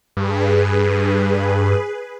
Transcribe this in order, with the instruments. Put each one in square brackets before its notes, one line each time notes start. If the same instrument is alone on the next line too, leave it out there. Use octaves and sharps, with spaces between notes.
[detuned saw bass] G2 [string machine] G#4 B4